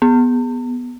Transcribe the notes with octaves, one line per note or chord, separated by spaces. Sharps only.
B3